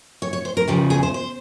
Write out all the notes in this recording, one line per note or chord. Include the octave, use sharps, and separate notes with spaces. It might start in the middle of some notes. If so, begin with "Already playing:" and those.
C#5
C#5
C5
A#4
E2 C#3 F3 G4
G#4
C5
C5